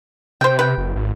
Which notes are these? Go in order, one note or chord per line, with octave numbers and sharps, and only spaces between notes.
C3 C5 G5
B4 G5
F#1
G#1